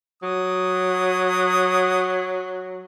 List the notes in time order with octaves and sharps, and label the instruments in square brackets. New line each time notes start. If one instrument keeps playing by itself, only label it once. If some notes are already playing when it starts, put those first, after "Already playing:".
[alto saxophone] F#3 [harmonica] D#6